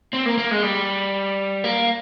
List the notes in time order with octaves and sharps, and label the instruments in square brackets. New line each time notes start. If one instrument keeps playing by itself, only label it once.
[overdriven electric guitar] C4
A#3
A#3
G#3
G3
A#3